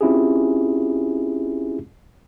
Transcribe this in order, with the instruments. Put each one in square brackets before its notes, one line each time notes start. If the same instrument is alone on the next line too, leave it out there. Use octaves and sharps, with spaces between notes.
[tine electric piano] C4 C#4 E4 F4 G4 G#4